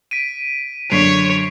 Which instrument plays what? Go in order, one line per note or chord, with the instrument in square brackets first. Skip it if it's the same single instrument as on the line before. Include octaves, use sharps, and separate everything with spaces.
[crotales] B6 D7 D#7
[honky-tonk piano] F#2 D3 B6 [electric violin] C#5 [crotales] C7 D7 F7